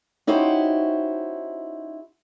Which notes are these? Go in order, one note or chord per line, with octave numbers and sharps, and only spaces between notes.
C#4 D#4 E4 F#4 G4 C5